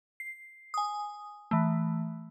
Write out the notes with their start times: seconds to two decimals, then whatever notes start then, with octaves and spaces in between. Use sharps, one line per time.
0.20 C7
0.74 G#5 D#6
1.51 E3 A3